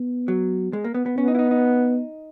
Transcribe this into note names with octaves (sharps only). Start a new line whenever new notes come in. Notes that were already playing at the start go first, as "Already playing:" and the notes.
Already playing: B3
F#3
G#3
A#3
B3
B3
B3 C#4
D#4
E4
D#4
D#4